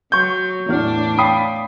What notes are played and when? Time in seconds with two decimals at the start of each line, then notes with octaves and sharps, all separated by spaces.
0.12 F#3 C#6 G6
0.69 E2 A2 B3 D4 F6
1.18 C#5 F5 G5 B5 D#6 C7